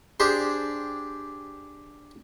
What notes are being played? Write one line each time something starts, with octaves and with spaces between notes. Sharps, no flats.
D4 G4 G#4 C5